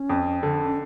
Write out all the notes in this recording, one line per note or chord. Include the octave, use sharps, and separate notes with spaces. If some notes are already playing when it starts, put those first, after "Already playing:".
Already playing: C#4
F2
D3
C#4